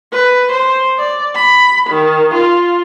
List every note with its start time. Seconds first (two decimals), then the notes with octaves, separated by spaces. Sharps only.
0.12 B4
0.52 C5
0.98 D5
1.35 B5
1.90 D#3
2.34 F4